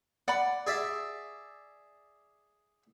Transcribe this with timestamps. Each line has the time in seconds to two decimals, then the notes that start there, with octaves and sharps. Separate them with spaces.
0.28 D5 F#5 B5
0.67 G#4 D5 E5